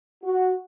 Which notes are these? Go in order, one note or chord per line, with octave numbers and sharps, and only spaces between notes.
F#4